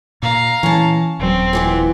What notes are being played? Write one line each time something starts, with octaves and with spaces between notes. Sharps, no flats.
A#2 F5 A#5
A#2 E3 C#4 A5
D#1 F#3 C4
A#2 E3 B3